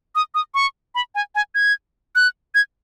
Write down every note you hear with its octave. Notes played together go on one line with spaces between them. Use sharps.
D#6
D#6
C#6
B5
G#5
G#5
G#6
F#6
G#6